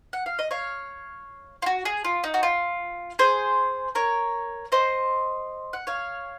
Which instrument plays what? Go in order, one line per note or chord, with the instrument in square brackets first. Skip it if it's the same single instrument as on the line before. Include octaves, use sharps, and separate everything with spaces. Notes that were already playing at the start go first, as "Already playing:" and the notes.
[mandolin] F#5
F5
D#5
C#5 F5
F4
F#4
G#4
F4
D#4
F#4
F4
G#4 C5
A#4 C#5
C5 D#5
F#5
C#5 F5